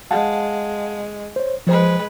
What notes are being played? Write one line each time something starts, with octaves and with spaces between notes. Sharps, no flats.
G#3 F5 F#5 A5
C5 C#5
F3 G#3 B4 C5